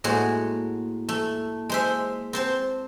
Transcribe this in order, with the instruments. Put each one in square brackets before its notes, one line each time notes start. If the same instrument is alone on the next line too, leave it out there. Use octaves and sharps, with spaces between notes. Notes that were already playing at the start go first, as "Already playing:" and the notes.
[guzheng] A2 G#3 F#4 [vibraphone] A#3
[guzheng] A3
G#3 C5 E5
C4 C5 A5